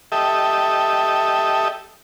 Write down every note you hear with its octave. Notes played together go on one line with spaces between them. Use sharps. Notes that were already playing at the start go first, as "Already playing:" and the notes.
G4 A4 D#5 E5